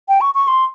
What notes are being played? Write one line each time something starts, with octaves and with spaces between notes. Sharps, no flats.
G5
C#6
C#6
C6